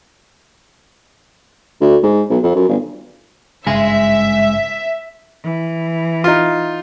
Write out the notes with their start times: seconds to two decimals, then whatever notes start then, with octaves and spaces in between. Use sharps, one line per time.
1.81 D2
2.03 G#2
2.30 B1
2.43 F2
2.55 F#2
2.69 G1
3.67 G#1 G2 C#3 G#3 E5 G#5
5.44 E3
6.24 D#4 F4